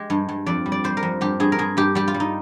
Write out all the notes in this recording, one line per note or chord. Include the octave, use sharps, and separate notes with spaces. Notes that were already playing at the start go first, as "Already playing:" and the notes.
Already playing: G#3 G4
G2
G2
F2 D5
G3
D5
G3 C5
A#4
F2
G2 G4
G2 G#4
A#4
G2 G#4
G2 G4
G3 G4
F4
G3
D#4